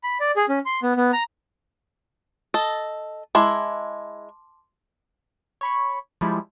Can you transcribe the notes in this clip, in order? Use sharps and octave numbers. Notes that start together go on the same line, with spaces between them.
B5
D5
G#4
C#4
C6
B3
B3
A#5
A4 D#5
G#3 E4 A5 C6 D6
C#5 B5 C#6
F3 G3 G#3 E4